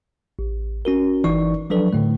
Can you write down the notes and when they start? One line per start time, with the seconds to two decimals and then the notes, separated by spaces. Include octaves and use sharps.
0.39 A1
0.85 C#4 F#4 A#4
1.24 G1 E3 D#4 D5 C#6
1.70 F3 F#3 D4 A4 B4 D5
1.93 A2 D3 A3